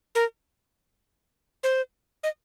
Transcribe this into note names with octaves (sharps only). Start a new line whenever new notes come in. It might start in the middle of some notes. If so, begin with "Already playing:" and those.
A#4
C5
D#5